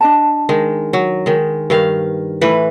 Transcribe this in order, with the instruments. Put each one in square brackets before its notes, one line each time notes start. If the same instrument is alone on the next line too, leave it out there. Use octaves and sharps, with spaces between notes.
[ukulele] D4 D#5 A5
[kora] D#3 G#3
F#3
D#3 G#3
G2 D#3 F5
A2 E3 B4